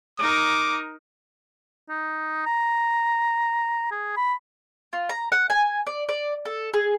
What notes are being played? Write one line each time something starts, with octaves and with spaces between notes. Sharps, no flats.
D#4 A#4 D6
D#4
A#5
G#4
B5
F4
A#5
F#5
G#5
D5
D5
A4
G#4